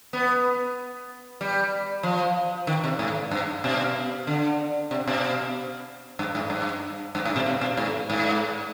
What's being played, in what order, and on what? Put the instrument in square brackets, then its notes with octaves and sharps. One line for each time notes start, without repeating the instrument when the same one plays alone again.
[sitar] B3
G3
F3
D#3
C3
G#2
G2
B2
D3
C3
B2
G2
G#2
G2
G2
G#2
B2
C3
B2
G#2
G#2